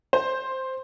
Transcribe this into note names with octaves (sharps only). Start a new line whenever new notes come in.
C5